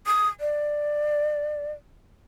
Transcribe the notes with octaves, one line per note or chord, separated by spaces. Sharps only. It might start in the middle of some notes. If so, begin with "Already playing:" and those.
D#6
D5